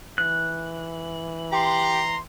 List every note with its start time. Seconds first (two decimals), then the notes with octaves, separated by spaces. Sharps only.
0.18 E3 F#6
1.52 G4 A#5 C6